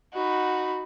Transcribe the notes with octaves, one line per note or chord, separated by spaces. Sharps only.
D#4 F#4 B5